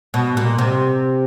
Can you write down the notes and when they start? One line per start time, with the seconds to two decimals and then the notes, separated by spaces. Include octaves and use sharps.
0.14 B2
0.37 A#2
0.58 C3